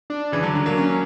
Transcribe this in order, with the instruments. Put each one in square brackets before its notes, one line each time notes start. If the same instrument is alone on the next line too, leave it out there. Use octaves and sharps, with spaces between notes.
[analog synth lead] D4
[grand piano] C#3 E3
D3 F#3
D3 F#3
F#3 A#3
[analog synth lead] C#4